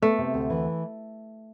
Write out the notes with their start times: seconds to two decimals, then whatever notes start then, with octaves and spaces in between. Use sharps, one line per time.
0.02 A3 B3
0.18 C3
0.34 D2
0.50 E3